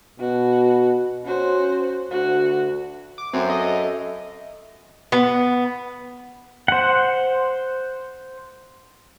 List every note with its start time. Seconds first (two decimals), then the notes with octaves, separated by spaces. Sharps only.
0.20 B2 F#4
1.26 C#4 F#4 C5
2.11 D2 F#4
3.18 D6
3.33 F#2 C4 A4 E5
3.50 D#5
5.12 B3
6.68 C5 F#5